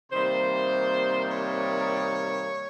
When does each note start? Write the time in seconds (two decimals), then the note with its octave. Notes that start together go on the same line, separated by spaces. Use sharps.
0.12 C3 D#3 G3 A#3 C5
1.29 C#5